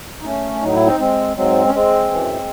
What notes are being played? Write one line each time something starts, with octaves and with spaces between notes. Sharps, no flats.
D#4
A3 C#4
A2 F#3 D#4
E4
C4 D#4
G#3 C4
G#2 F#3 G#3 C4
C#4
G#3 C4
F#2 E3